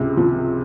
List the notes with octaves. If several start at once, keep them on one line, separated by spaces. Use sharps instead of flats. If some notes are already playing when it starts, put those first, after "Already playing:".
Already playing: C#2 C3
F3